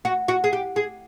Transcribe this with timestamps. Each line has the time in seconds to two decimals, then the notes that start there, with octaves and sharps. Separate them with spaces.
0.05 F#4
0.28 F#4
0.44 G#4
0.53 G4
0.76 G#4